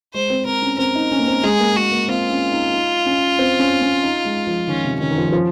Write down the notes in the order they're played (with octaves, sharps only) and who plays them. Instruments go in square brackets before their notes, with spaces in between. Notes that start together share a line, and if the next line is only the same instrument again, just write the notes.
[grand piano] G#3 [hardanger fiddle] C5
[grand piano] C4
[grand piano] C4 [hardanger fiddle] A#4
[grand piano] C#4
[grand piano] C4 [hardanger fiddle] A#4
[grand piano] D#4
C#4
A#3
C4
[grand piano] G#3 [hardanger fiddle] G#4
[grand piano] A#3
[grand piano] A#3 [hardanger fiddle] F#4
[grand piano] A#3
[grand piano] C4 [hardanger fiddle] F4
[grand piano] C#4
D#4
D#4
C#4
C4
C#4
C#4
D#4
G#3
F3
[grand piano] D#3 [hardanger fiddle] C#4
[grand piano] C3
[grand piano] D#3 [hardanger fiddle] C#4
[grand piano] D#3
F3
D#3
F3